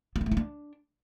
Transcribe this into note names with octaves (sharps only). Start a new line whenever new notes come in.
B3
D4
A3
D#4
D4